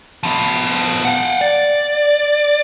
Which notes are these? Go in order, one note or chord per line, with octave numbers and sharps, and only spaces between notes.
F3 B3
F5 F#5
D5